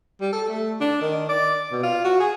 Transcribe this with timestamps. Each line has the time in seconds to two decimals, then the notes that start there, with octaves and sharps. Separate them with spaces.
0.21 G3
0.33 A4
0.49 A3
0.81 D4
1.01 D#3
1.29 D5
1.72 B2
1.83 F4
2.04 F#4
2.20 G#4